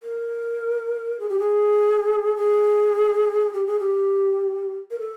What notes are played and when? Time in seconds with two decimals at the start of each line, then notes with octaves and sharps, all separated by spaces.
0.03 A#4
1.20 G#4
1.29 G4
1.39 G#4
2.36 G#4
3.53 G4
3.66 G#4
3.79 G4
4.91 A#4
4.99 A4